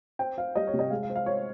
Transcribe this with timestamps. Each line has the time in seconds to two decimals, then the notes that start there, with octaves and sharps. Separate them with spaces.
0.19 C4 G5
0.38 C4 F5
0.56 G3 D#5
0.67 C#5
0.74 C3
0.79 D#5
0.91 G#3 F5
1.03 F5
1.09 C4
1.15 F5
1.26 C4 C#5